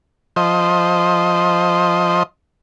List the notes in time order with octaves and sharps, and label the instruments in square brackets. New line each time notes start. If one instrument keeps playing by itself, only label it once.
[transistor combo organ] F3 C5 D#5